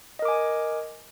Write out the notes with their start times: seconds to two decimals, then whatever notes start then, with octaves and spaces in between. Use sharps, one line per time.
0.19 D#5
0.22 A#4
0.25 D6
0.28 G#5